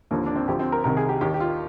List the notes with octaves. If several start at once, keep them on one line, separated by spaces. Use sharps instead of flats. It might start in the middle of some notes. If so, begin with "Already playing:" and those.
D#2 D3 F3 A#3
D4
C4
D2 D3 F3 G4
C4
A#4
C2 C3 D#3 A#4
G#4
G4
D#2 D#3 G4
G4
F4